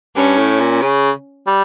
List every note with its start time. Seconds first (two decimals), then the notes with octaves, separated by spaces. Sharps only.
0.16 G2 C#4
0.38 A2
0.60 A#2
0.81 C#3
1.47 G3